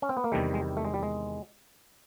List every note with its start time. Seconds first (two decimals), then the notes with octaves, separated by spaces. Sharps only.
0.02 C#4
0.09 C4
0.17 B3
0.24 A#3
0.32 E2 C3 D#3 G3 A3
0.54 G#3
0.77 A3
0.85 G#3
0.94 G3
1.03 G#3